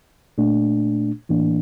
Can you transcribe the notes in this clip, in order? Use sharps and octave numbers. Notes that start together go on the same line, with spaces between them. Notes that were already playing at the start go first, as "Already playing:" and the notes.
A#2 A3 D4
A2 E3 A#3 D4